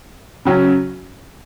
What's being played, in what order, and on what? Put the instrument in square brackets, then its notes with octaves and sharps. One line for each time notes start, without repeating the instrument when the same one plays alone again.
[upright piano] C#3 F#3 C#4